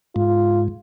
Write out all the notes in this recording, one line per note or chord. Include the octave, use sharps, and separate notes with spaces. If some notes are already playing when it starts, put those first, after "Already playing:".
G#2 F4